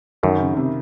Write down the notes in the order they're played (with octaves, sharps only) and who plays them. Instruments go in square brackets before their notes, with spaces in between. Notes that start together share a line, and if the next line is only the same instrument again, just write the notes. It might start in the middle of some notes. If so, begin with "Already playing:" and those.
[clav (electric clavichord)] F#2 [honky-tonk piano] D#3
[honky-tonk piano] C#3
C3